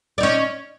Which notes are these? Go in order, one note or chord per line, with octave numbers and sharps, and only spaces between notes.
C#4 D#4 D5